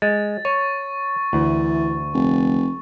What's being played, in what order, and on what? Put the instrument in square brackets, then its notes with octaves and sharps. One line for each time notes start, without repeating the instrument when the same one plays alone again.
[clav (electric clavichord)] G#3 [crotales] A6
[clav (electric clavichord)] C#5 [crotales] C#6
[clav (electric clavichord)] D2 [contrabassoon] E3
[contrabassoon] F1